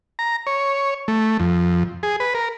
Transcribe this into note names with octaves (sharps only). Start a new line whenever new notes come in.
A#5
C#5
A3
F2
G#4
B4
A#4